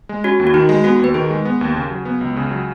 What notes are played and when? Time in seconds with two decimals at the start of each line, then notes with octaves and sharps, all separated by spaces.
0.09 G#3
0.24 C#4 F#4
0.40 D#2
0.47 F#4
0.54 D#3 D#4
0.69 G#3
0.84 B3 F#4
0.99 D#2 B4
1.14 D#3 G#4
1.30 G#3
1.45 B3
1.61 D#2
1.76 C#3
1.90 F#3
2.05 B3
2.21 C#2
2.37 C#3
2.51 F#3